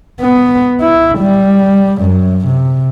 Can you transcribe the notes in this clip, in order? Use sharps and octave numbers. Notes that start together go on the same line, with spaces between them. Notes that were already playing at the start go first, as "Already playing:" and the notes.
B3
E4
G3
F#2
C3